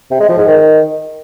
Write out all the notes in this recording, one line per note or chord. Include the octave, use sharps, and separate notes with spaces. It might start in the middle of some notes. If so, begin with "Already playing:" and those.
C3
G#3
F3
G#2
D#3